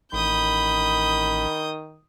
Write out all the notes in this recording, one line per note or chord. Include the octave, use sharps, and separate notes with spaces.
A1 D#3 B5 D#6 G6